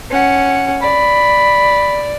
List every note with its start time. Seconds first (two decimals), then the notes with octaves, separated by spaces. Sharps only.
0.10 C#4 F#5
0.82 D5 B5